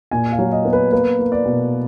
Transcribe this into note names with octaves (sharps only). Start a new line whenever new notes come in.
A#2 G#5
F5
F#3
D#5
B3
B4
A#3 B4
A#3
D5
B2